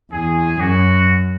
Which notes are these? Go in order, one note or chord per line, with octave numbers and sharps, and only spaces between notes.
E2 G#4
F#2 F#4